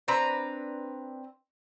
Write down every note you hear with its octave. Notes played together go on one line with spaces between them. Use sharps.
C4 D4 B4 A#5